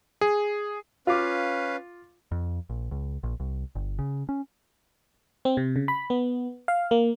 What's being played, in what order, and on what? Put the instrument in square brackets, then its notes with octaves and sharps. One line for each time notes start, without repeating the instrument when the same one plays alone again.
[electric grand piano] G#4
[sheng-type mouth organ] C#4 B4 F5 [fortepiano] F4 D6
[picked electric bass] F2
A#1
C#2
A#1
C2
G1
C#3
C#4
[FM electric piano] C4
C3
C#3
B5
B3
F5
A#3